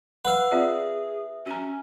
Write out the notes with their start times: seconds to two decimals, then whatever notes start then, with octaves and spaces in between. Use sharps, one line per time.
0.25 B4 F5 F#5 E6
0.51 C4 F4 G#4 D5 E5
1.46 C#4 F#4 A#5